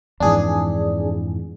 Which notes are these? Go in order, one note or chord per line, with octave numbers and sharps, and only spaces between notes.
F2 G#2 E3 D4 G#4